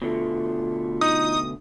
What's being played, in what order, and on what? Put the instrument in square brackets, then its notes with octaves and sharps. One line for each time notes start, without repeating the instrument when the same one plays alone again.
[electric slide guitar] B2 D3 A3 [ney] F4
[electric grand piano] D#4 [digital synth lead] D#6